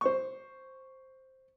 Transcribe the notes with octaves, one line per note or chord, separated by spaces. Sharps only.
C5 C#6